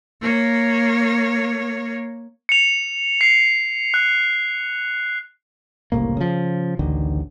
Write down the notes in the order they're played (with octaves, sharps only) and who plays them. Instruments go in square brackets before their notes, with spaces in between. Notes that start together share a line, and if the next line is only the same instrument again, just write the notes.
[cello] A#3 C#5
[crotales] C#7 F7
C7
F#6
[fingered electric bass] F#1 C2 A2 A#3
C#3 F3
A1 D2 D3 D#3